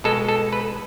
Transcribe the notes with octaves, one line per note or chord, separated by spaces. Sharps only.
B2 G#3 A4
A4
B4